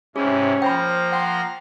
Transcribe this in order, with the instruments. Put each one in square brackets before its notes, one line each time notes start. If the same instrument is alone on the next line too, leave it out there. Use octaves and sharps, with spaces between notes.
[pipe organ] G#2 C3 E4 [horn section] C#4 [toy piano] G#4
[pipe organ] F3 A#3 A#5 [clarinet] C5 [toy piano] G5 B5
[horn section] F#5 C6 [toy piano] G5